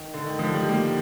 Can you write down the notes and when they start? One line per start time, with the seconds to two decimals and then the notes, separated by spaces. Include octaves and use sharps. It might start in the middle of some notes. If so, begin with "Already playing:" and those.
Already playing: D#3
0.14 D3
0.26 D#3
0.39 D3 F3
0.54 D#3 G3
0.69 G3 A#3